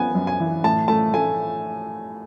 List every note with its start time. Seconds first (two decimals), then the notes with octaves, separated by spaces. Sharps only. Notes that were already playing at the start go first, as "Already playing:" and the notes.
Already playing: B3 G#5
0.15 F#2
0.27 G#5
0.40 E3
0.64 A2 A5
0.88 A3 A5
1.13 A3 G#5